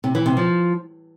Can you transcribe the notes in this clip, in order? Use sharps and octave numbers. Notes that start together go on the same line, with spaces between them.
C3
E3
C3
F3